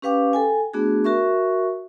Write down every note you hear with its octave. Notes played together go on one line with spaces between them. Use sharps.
C#4 G4 B4 F5 G5 D6
A4 G5 G#5
A3 B3 D4 F#4 G#4
F#4 A#4 E5 C#6